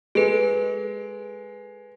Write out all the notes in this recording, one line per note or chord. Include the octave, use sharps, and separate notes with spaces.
G#3 A4 B4